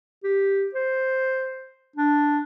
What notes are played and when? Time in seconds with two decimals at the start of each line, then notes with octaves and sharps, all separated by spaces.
0.24 G4
0.74 C5
1.96 D4